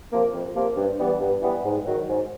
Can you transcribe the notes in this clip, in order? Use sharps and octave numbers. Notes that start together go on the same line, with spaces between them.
C3 F3 A#3
F2
C3 F3 A#3
G2
E3 G3 B3
G2
E3 G3 B3
G#2
D#3 F#3
G#2